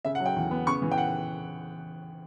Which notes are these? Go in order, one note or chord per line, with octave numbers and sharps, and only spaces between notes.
C#3 E5
F#5
F#3
G5
E2
B3
C#3 C#6
E3
G5
F#5